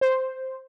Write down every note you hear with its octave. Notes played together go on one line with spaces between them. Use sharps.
C5